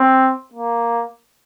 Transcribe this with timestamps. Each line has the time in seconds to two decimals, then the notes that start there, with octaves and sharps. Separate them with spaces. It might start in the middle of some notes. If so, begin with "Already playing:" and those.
Already playing: C4
0.54 A#3